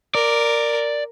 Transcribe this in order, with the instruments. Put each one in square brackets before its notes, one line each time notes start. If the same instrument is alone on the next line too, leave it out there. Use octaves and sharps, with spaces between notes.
[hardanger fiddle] A#4 [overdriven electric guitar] D5